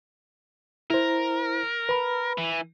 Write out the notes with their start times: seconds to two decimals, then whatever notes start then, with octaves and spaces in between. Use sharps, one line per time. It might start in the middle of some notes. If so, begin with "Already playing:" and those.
0.90 E4 A#4 C5
1.89 B4 B5
2.38 E3